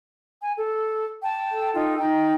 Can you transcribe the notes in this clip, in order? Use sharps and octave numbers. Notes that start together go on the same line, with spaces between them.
G#5
A4
G5 A5
A4
D#4 F4 G5
D#4 G5